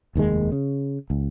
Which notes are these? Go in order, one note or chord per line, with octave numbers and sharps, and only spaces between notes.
F1 D#2 D#3 G#3
C#3
C#2